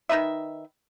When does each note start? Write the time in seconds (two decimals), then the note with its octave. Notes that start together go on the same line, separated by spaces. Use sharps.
0.09 D#3 D#4 B4 E5